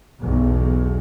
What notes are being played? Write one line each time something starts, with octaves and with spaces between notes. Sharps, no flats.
B1 E2